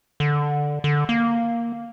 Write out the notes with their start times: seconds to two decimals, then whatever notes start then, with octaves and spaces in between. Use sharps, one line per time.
0.20 D3
0.84 D3
1.09 A#3